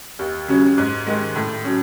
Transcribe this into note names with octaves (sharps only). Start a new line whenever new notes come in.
D#2
C#3 F#3 C#4
G#2
D#3 G#3
A2
F#3 C#4